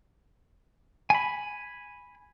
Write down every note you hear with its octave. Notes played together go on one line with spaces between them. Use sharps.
G#5 B5